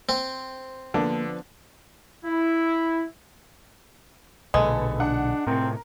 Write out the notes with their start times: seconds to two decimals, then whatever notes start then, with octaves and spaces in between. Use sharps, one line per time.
0.09 C4
0.94 D3 F3 A#3 B3 D4
2.24 E4
4.54 B1 A#2 D3 G#3 A4 B4
5.00 D4 F#5
5.47 A2 C3 C4 A#4